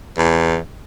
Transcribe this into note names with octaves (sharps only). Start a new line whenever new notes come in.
E2